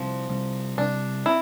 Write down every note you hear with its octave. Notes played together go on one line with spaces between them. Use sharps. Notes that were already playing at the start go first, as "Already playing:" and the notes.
Already playing: C3 F3 G3 C4
C3 G3 C4
C3 G3 C4 D4
C4 E4